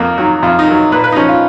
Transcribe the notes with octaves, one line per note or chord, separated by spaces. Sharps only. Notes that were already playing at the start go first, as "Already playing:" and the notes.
Already playing: F2 A#3
D#3 F#3
F2 F4
D#4
D#3 F#3
A#2 B4
B4
D#4
F3 C#4
F4